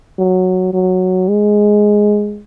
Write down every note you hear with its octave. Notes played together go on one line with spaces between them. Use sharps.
F#3
F#3
G#3